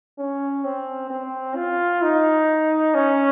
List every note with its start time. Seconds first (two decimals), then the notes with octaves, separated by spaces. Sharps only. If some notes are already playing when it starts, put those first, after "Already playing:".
0.18 C#4
0.65 C4
1.10 C4
1.56 F4
2.03 D#4
2.95 C#4